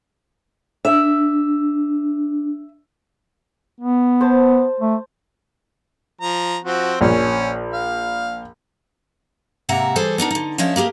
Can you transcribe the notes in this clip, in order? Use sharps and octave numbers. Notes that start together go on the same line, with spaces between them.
D4 E5
B3
C5 A5
A3
F3 A#5
F3 C4 F#4
A#1 C#4
F5
G#2 C3 A#3 E5 F#5 A#5
E3 G3 G#4 A4 C5 G#5
B3 D4 D#4 A#4
D3 D#4
F3 C#4 D4 C#5 D#5 E5
A#3 G4 G#4 A#4